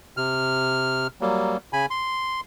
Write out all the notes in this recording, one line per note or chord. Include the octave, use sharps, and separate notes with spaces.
C3 F6
F#3 G3 A#3
C#3 G#5 B5
C6